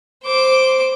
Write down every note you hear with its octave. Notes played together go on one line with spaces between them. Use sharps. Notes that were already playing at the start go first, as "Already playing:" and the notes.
C5 D6